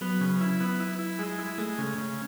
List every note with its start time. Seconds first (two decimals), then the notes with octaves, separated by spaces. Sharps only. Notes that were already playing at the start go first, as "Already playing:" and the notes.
0.01 F#3 B3
0.21 C#3
0.41 E4
0.60 B3
0.80 E4
0.99 E4
1.19 G#3
1.38 E4
1.58 G#3 A3
1.78 C#3
1.98 C#3